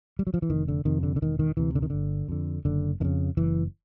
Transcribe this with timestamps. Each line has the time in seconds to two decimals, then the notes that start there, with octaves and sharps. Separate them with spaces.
0.19 G3
0.27 F#3
0.34 F3
0.42 E3
0.49 F1 D#3
0.68 D3
0.85 F2 C3 D#3
1.03 D3
1.16 D3
1.22 E1 D#3
1.39 D#3
1.57 D2 C3 E3
1.75 D3
1.82 D#3
1.90 G1 D3
2.29 F2 D3
2.65 F#1 D3
3.00 F2 D#3
3.05 C#3
3.37 F#1 E3